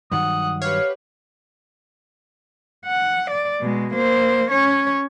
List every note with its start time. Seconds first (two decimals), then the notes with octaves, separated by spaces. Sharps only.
0.12 G2 D#3 F#3 F#5 D#6
0.62 G4 B4 C#5 F5
2.86 F#5
3.30 D5
3.61 B2 G#3
3.93 A#3 C5
4.51 C#4 C#5